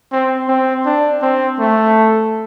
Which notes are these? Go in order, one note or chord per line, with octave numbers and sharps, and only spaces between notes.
C4
C4
D4
C4
A3